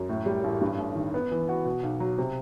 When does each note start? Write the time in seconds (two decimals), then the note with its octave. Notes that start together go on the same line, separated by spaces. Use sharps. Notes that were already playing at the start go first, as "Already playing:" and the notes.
Already playing: F#2
0.09 A2
0.26 G3
0.44 A1
0.61 G2
0.78 A1
0.95 D#3
1.14 B3
1.31 E3
1.49 F#4
1.65 B2
1.83 B1
2.00 F#3
2.18 C3